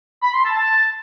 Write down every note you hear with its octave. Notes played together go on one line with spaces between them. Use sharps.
B5
C6
A5
A5